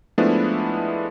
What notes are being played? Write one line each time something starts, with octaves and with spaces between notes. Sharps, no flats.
F3 G#3 A3 B3 D4 E4